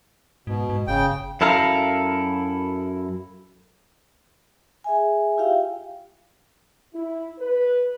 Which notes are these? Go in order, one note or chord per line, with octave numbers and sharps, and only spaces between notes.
G#2 B2
G#2
F#1 C#3 G5
F#2 E4 A4 F5 A#5
G#4 E5 G#5
E4 F4 G4 E5 F5 G5
E4
B4